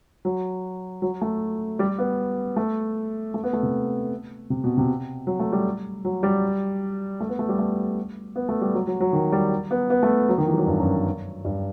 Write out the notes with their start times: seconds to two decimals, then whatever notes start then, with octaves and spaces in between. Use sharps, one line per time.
0.25 F#3
1.02 F#3
1.22 A3
1.79 G3
1.98 B3
2.57 A3
3.34 A3
3.44 B3
3.53 A3
3.63 C3
4.50 C3
4.64 B2
4.77 C3
5.27 F#3
5.39 A3
5.52 G3
6.05 F#3
6.23 G3
7.20 A3
7.29 B3
7.39 A3
7.49 G3
7.59 A3
8.36 B3
8.49 A3
8.61 G3
8.74 F#3
8.87 F#3
9.00 F#3
9.13 D#3
9.32 G3
9.71 B3
9.90 B3
10.03 A3
10.29 F#3
10.38 D#3
10.48 E3
10.53 G3
10.57 F#3
10.67 G2
10.80 F#2
11.45 G2